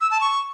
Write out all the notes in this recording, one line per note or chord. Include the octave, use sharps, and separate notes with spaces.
E6
A5
C#6